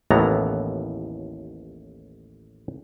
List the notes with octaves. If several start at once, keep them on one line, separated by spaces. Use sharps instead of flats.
A1 D#2 A2 E3 B3 A#5